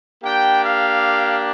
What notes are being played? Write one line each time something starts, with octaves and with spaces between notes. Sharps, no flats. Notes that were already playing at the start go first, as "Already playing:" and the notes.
A#3 D4 G4 G5
F5